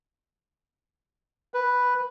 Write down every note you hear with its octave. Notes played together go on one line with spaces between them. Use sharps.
B4